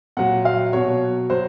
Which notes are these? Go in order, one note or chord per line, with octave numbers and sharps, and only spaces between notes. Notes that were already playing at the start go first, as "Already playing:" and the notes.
A#2 F#3 F#5
F5
B2 F#3 C#5
F#3 C5